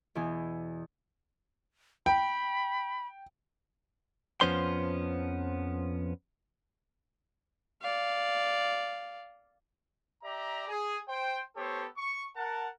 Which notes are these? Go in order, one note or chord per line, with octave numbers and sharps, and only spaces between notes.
E2 B2 E3 G#5
G5 B5
F2 F3 B3 C#4 C5 C6
D5 F5
G4 D5 E5 A#5
G#4
C5 G5
A3 B3 G4 A4 C5 C#5
C#6
A#4 F#5 A5